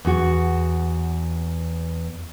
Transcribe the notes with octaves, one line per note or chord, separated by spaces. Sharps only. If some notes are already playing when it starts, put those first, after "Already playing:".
E2 F#4